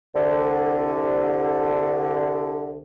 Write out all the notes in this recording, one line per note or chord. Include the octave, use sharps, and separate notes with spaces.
C2 D3